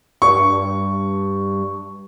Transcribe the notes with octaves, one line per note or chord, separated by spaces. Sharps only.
G2 C#6